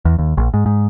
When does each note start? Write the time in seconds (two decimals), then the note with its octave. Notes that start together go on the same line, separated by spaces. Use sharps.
0.05 E2
0.19 D#2
0.37 A#1
0.54 G#2
0.66 G#2